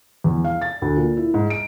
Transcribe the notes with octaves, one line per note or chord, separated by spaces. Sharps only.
E2
F5
A6
D2
A#2
E4
G#2
D7